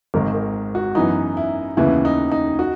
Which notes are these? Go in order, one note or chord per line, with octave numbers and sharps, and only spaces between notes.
G#1 G#2 D#3 A#4
A#4
F#4
F#2 E3 B3 D#4
E4
D#2 C#3 E3 B3 E4
D#4
D#4
F#4